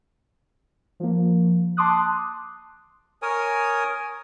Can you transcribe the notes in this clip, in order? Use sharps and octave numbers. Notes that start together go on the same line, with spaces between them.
F3 A#3
A5 C6 D6 D#6 F#6
A#4 C#5 G#5 D#6